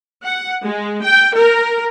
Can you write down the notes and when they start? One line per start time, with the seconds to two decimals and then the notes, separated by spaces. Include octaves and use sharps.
0.24 F#5
0.65 G#3
1.04 G5
1.36 A#4